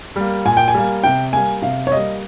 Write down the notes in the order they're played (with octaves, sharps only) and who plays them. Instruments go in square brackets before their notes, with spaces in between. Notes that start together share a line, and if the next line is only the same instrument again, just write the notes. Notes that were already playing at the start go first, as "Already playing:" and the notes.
[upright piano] G3 A#3
A#2 G#5
G5
G#5
G3 A#3
C3 G5
G3 A#3 G#5
C3 F5
C#5
G3 A#3 D#5